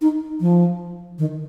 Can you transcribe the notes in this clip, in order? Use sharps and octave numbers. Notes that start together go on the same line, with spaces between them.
D#4
F3
D#3